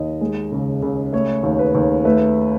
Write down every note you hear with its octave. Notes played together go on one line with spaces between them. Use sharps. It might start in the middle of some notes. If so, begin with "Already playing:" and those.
Already playing: D#2 D#5
G#3
C#2
C#2
A3 C#5
D#2
B4
D#2
A3 B4